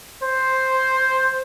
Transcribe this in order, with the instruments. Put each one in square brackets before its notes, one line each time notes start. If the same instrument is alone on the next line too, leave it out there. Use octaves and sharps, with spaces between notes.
[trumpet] C5